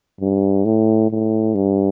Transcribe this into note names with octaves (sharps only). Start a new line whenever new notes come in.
G2
A2
A2
G2